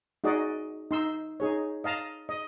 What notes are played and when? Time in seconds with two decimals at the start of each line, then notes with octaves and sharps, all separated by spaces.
0.24 D#4 F#4 G#4 D5 D#5
0.91 D#4 C6 E6
1.40 D#4 G#4 C#5
1.84 D#5 F5 A5 A#5
2.29 D#5